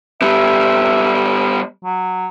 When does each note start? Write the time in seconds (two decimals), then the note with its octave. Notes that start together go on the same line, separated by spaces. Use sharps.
0.22 G3 B3 E5
1.84 F#3